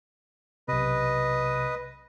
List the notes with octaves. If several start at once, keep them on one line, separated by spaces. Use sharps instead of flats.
B1 C3 B4 D#5